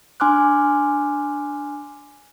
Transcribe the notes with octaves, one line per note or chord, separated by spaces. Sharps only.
D4 G#5 C6 D6 F6 F#6